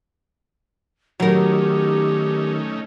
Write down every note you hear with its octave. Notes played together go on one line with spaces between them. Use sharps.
D#3 F#3 A3 C#4 D#4 G4 A#4